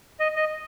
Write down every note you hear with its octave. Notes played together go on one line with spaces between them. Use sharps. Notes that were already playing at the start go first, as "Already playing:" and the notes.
D#5
D#5